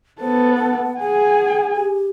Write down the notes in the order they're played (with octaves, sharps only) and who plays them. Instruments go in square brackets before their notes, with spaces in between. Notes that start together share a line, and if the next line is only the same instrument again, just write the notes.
[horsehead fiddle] B3 A4 [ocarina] C5
[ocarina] F#5
[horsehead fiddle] G#4 G#5 [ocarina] F#5
[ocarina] G4